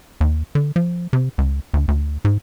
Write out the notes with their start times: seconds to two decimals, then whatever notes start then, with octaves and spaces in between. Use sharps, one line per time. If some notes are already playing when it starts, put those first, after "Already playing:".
0.21 D#2
0.55 D3
0.76 F3
1.13 C3
1.38 C#2
1.74 D2
1.88 D2
2.25 G#2